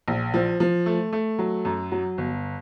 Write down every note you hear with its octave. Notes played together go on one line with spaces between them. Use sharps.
A#1
F3
F3
A3
A3
F#3
F#2
F#3
G1